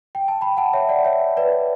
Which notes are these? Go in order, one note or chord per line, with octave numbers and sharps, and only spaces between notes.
G5
A5
G5 B5
F#5 A5
C#5 E5
D5 F#5
C#5 E5
B4 D5